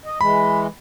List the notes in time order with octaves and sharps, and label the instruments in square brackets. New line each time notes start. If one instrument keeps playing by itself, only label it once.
[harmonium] D#5
[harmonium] E3 G#3 [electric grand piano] B5